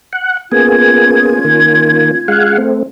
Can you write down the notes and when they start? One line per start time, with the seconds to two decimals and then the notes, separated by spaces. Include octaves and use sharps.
0.13 F#5
0.52 A#3 B3 C#4 F4 G#4 G#6
1.45 D#3 A#3
2.28 G#3 F5 F#5
2.58 A3 C4